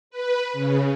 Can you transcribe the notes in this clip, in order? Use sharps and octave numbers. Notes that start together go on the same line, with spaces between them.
B4
C#3